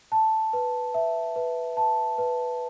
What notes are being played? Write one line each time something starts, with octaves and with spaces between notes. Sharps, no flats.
A5
B4
E5
B4
A5
B4